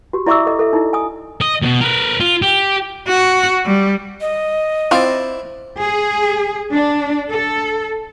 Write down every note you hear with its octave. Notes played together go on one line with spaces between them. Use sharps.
F#4 G4
E4 D5 E5 C#6 D6 E6
A4 D#5
A4 E5
D#4 E4
G#5 D#6
D#5
D#2 B2
A#4 B4
F4
G4
F#4
G3
D#5
C4 E4 F4 C5 D5
G#4
D4
A4